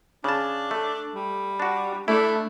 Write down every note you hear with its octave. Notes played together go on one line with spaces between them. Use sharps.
C#3 D4 A5
A3
G3
D4 F#4
A3 D4 E4